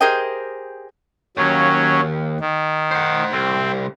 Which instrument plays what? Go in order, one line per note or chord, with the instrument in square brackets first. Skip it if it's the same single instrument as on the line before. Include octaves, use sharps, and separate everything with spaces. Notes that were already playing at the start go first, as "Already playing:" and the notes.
[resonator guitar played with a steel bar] G4 G#4 A#4 C5 D#5 G5
[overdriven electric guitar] D#2 [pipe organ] F#3 C#4
[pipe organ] D#3
[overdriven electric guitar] C5 F#5
[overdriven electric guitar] C2 [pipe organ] C4